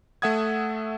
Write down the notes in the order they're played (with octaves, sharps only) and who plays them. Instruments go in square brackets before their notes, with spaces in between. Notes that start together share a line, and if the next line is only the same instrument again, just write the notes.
[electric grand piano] A3 A4 E5 F#5 D#6 G#6